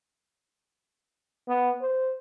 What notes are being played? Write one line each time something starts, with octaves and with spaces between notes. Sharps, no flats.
B3
C5